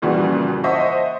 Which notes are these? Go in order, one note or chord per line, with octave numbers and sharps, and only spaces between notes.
F2 A#2 C#3 E3 G3 F#4
C5 D#5 E5 F#5 A5 C#6